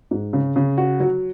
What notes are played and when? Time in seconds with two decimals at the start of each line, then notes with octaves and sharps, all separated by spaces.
0.11 G#2
0.33 C#3
0.56 C#3
0.78 F#4
1.00 F#3